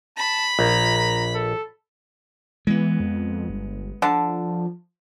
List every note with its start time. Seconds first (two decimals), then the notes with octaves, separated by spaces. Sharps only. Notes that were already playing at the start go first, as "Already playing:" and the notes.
0.17 A5 B5
0.59 A#1 A#5
0.97 A#5
1.35 A4
2.67 E3 G#3 B3
3.00 F2
3.49 G1
4.02 D3 F3 A5